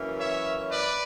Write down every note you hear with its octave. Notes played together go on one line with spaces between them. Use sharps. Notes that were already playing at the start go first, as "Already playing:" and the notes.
Already playing: F#2 E3 A#3 C#4
C#5 E5
B4 D5